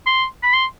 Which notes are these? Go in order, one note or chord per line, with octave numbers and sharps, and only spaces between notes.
C6
B5
C6